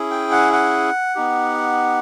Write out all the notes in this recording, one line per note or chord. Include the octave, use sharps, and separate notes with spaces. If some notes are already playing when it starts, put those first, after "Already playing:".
Already playing: C#4 E4 G#4
G5
F#5
F#5
B3 D#4 G4